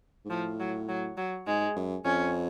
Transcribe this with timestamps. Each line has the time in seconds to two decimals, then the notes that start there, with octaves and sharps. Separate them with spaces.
0.25 G#2
0.30 A2 F3
0.60 F#3
0.88 F#3
1.17 F#3
1.47 G#2 G#3
1.76 F#2
2.05 F2 C#4